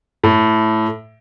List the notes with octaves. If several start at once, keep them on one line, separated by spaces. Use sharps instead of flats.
A2